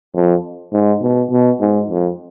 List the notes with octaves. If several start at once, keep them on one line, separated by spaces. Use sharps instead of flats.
F2
G#2
B2
B2
G#2
F2